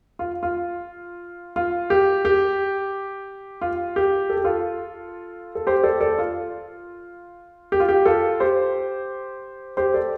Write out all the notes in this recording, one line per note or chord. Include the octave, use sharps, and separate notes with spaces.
F4
F4
F4
G4
G4
F4
G4
A4
G4
F4 A4
A4
G4 C5
A4 D5
A4 D5
F4
G4
F4
G4
F4 A4
G4 C5
G4 C5
A4 D5